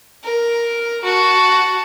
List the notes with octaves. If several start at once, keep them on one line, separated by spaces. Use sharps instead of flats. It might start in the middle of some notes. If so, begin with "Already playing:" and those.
A#4
F#4 A5